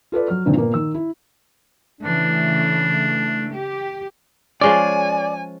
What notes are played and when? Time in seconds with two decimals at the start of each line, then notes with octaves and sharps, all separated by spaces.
0.12 F4 A4 B4 D5
0.28 F#3 F6
0.45 G2 A#2 D3 D#3 C4
0.57 A#2 A#3 B3
0.74 D#3 E6
0.94 E4
2.01 C#3 E3 A3 D4
3.53 G4
4.61 F3 G#3 C#4 D5 G#5